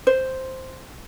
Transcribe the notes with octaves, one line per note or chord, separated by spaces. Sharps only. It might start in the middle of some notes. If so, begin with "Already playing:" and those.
C5